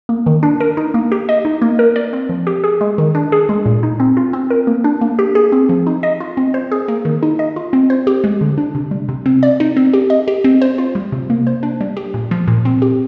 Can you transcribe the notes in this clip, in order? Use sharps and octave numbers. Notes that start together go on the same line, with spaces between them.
A#3
D#3
D4
A#4
D#4
A#3
G4
D#5
D#4
A#3
A#4
D5
C4
F3
G4
G#4
G#3
D#3
D4
G#4
G#3
A#2
D#4
C4
F4
C4
A#4
A#3
D4
A#3
G4
G#4
C4
F3
D#4
D#5
F4
C4
C5
G#4
A#3
D#3
D#4
D#5
F4
C4
C5
G4
G#3
D3
D4
C3
G3
C3
C4
D5
D#4
C4
G4
D#5
G4
C4
C5
F4
G3
C3
A#3
C5
D4
G3
G4
A#2
F3
A#2
C4
G4